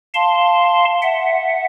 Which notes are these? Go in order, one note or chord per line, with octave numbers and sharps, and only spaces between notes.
F5 A5 C6
E5 F#5